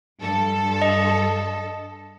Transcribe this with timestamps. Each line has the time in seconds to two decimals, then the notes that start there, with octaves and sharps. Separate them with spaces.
0.21 G2 A4
0.82 D#5